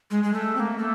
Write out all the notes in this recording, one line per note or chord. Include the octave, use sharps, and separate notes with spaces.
G#3
G#3
A3
C4
A#3
A3